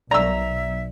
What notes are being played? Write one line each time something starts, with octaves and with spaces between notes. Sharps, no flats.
B1 D5 E5 A#5 E6